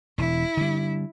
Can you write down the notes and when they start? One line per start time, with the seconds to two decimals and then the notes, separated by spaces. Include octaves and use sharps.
0.18 E1 E4
0.57 D3 G3